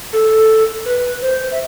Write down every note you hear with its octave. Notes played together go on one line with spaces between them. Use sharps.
A4
B4
C5
E5